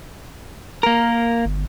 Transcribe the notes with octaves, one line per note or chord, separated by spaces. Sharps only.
A#3 A#4
G1